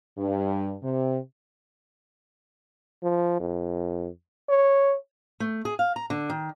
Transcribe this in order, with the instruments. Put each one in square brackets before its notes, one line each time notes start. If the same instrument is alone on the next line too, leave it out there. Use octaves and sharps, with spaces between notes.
[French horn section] G2
C3
[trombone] F3
F2
C#5
[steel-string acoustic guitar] A3
G#4
F5
A#5
D3
D#3